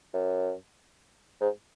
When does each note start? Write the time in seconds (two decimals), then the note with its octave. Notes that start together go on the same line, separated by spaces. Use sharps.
0.14 F#2
1.41 G#2